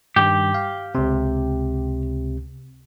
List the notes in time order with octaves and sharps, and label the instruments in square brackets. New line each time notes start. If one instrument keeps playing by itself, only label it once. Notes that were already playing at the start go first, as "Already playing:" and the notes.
[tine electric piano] G2 D#3 [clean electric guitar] G4
[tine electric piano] F5
C#2 C3